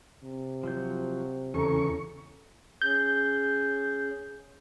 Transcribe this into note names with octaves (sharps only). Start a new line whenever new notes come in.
C3
F3 F#3 G6
E2 C#3 C#4 A4 A#5 C#6
C#4 G#4 G6